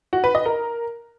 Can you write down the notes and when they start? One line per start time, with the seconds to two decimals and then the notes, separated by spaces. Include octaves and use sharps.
0.13 F#4
0.24 B4
0.35 D#5
0.46 A#4